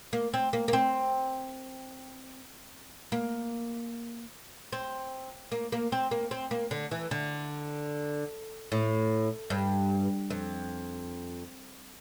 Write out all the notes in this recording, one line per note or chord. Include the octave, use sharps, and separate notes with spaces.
A#3
C4
A#3
A#3
C4
A#3
C4
A#3
A#3
C4
A#3
C4
A#3
D3
E3
D3
A2
G2
F2